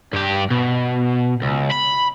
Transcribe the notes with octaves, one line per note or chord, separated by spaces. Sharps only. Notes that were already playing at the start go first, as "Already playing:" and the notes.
G2 G4
B2
C#2
B5